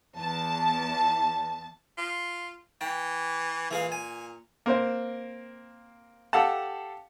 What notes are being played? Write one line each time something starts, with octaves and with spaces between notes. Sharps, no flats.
E2 A5
F4
E3 G5
A#2 E3 G#4 F5
G#5
A#3 C4 C5
G4 A4 F5 F#5 A5